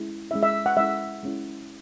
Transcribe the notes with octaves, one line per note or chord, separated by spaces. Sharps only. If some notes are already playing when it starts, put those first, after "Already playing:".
Already playing: G#3 C#4 E4
G#3 C#4 E4 E5
E5
F#5
G#3 C#4 E4 E5
G#3 C#4 E4